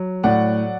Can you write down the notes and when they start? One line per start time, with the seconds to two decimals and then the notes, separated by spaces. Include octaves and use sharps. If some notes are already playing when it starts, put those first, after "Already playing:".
Already playing: F#3
0.23 A2 D5 F#5